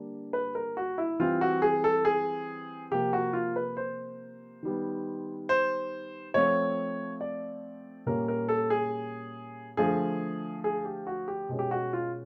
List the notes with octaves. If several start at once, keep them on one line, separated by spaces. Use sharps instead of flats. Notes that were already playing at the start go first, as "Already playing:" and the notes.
Already playing: D3 G3 A#3 D4
B4
A#4
F#4
E4
E3 G3 C4 F4
F#4
G#4
A4
G#4
C3 F3 A#3 G4
F#4
F4
B4
C5
D#3 G3 B3
C5
F3 A3 C4 C#5
D5
A#2 G3 A#3 C#4 A#4
A#4
A4
G#4
D3 F3 A3 G#4
G#4
G4
F#4
G4
B2 G#3 C#4
G4
F#4
F4